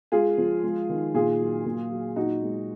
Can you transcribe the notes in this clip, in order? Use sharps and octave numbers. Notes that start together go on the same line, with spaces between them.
G#3 F4 G#4
F3
G#3
D#3
A#2 F4 G#4
F#3
A#2
F#3
A#2 D#4 F#4
G#3